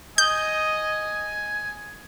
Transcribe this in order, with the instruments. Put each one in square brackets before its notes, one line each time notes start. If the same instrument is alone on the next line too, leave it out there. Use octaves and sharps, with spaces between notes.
[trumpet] D#5 [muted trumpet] G#5 [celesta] D#6 [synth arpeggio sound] G6